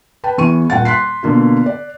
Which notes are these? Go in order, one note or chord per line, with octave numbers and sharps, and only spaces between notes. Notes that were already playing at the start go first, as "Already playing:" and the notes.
B4 G5 A5
E2 E3 C#6 D#7
D#1 F#5 G5 A6
C6 F#6 B6 C7
B2 D3 A#3 F4
D5